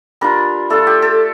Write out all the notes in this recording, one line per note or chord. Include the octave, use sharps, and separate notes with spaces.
G3 D4 F4 A#4
A3 D4 F4 A4
G4
A4